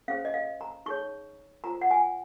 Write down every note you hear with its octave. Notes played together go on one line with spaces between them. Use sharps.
C#4 G#4 C5 F5
D#5
F5
A#5
D#4 G#4 C#5 C#6
F4 C5 A#5
F#5
G#5